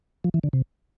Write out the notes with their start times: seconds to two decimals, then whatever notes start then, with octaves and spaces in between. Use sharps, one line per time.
0.24 F3
0.34 E3
0.43 D3
0.53 C3